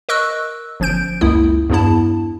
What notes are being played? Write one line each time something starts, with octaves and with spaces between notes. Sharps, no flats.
A#4 D#5 C#6 E6 F#6
G1 F3 C#4 G6 D7
C#2 F#2 A#3 E4 D#6
E2 G2 B3 D4 E4 A5